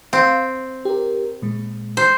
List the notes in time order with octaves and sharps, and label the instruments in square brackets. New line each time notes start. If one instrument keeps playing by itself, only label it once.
[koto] C4 [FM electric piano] F5
[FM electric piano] G4 A#4
A#2 G#3
[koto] C5